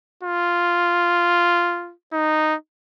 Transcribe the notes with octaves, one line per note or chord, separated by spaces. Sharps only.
F4
D#4